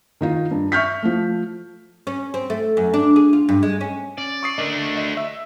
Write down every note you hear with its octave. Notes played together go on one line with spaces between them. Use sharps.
D#3 D#4 F4
G2
E5 C#6 F6 G6 B6
F3 A3
C#4
C4
A3
F#2
D4
G#4
F4
G2
G#3
C#4
C#4 D5
C#6 D#6 C7
A3 D4 A#4 D#5
D#5 B6
E5 E6